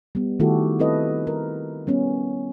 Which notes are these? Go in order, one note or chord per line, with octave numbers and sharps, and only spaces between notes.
G3 B3
D#3 A3 E4 F#4 G4 A4
C4 E4 A4 B4 D#5
A#4
G3 B3 C#4